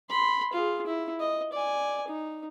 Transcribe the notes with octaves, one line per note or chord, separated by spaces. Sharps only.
B5 C6
F4 G#4
E4
D#5
D5 G#5
D#4